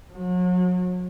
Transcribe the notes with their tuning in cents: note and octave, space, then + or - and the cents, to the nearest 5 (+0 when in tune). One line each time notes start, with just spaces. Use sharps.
F#3 -35